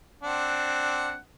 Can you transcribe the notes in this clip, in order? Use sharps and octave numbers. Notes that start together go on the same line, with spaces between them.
C4 D4 F#5